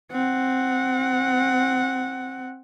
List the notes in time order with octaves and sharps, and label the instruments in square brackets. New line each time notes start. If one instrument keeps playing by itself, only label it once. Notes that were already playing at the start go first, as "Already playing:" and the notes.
[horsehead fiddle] C4 F#5